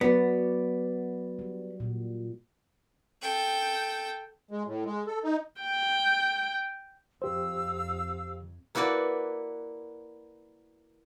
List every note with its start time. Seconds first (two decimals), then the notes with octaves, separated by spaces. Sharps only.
0.01 F#3 B3 F#4 D5
1.39 G3
1.80 A#2
3.22 A4 G5
4.51 G#3
4.66 A2
4.85 G#3
5.07 A4
5.23 D#4
5.61 G5
7.22 F2 G4 C5 F5 E6
8.75 A#3 E4 F#4 B4 D5